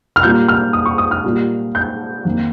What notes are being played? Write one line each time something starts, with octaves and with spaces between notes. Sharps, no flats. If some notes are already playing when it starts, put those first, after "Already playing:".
F6
A#2 G3 A#3 G6
F6
D#6
C#6
D#6
F6
A#2 G3 A#3
G6
F2 D#3 A#3